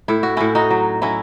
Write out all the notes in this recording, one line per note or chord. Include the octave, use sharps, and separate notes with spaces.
A2 E4
F#4
A2 C#4 E4
D#4 F#4
F#3
F#3 C#4 E4